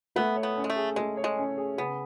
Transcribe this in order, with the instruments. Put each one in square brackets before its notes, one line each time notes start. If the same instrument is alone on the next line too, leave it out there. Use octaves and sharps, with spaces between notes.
[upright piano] A3 [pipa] B3
[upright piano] C#5
[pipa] B3
[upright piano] C#4
[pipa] G#3
A3
[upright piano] G#4
[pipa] G#3 [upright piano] A3
[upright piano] C#5
[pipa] G#3
[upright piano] C#4
G#4
[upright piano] C#3 [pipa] B3